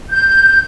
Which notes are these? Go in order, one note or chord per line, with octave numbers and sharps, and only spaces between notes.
G6